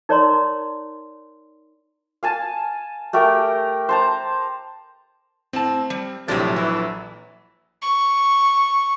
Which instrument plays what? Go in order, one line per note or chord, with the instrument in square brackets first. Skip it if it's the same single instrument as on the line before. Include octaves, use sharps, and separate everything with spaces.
[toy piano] D#4 A#4 C#5 D5 A#5 C6
[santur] F5 G#5 A5
A3 G4 A#4 G5
C5 A5 A#5
[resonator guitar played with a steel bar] A2 A5 [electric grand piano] C4
[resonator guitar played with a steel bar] G3
[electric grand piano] A#1 F#3 A6 [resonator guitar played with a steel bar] A2 G#3 A3 [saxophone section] C3 D4
[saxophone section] E3 [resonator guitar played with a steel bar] E4
[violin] C#6